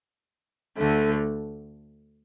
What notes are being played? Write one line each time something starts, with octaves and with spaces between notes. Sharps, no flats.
D2 D3 A3